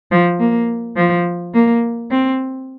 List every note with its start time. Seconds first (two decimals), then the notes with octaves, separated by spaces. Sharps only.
0.12 F3
0.39 A#3
0.97 F3
1.54 A#3
2.11 C4